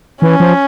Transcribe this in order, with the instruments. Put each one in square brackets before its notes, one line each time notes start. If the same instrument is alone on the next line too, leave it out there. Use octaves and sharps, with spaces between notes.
[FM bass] E3 [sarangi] C#4
[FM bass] F3